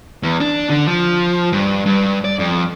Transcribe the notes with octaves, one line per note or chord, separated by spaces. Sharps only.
E2
D4
D3
F3
G2
G2
D5
F2